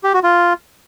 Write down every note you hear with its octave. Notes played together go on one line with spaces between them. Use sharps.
G4
F#4
F4